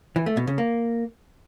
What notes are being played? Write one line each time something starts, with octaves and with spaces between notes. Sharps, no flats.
E3
A3
B2
C#3
A#3